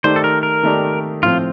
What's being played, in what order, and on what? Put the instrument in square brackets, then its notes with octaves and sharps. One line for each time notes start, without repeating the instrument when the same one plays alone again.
[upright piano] D#3 A3 D#4 G4 D5 [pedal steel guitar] C5
[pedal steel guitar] A4
A#4
A#4
[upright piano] D#3 A3 D#4 G4 D5
[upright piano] A2 F3 C4 [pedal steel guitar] F4